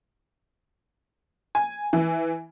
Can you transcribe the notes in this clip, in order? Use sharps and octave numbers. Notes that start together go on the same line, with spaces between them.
G#5
E3